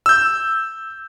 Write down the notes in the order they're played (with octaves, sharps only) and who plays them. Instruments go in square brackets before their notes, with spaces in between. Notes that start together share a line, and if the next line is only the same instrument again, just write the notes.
[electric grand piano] E6 G6